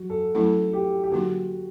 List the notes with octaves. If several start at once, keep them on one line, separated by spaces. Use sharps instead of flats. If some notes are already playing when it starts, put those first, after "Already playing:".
Already playing: F#3 F#4
A4
F#3 A3 C#4 E4 A4
G4
G4
D3 F#3 A#3 D#4 F#4